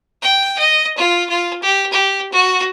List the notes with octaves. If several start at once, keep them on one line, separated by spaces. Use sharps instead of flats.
G5
D#5
F4
F4
G4
G4
F#4